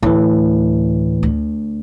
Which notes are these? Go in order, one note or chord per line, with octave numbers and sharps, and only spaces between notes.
D2 A2 E3
D2